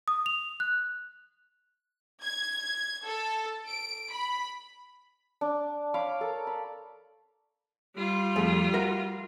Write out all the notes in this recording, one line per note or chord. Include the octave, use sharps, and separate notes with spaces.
D#6
F7
F#6
G#6
A4
D7
B5
D4
C#5 F5 B5 D6
A4 A#4
B5
G3 F4
F2 A3 G#4
F#4 A#4 E5